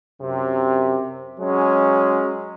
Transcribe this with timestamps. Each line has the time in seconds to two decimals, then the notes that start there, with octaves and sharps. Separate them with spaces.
0.20 F#2 C3
1.40 F#3 G#3 C#4